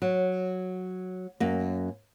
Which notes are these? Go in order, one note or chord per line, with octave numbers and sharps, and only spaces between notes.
F#3
F#2 A#3